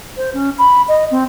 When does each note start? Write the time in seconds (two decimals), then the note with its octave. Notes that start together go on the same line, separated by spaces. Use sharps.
0.17 C5
0.34 C#4
0.58 B5
0.88 D#5
1.11 C4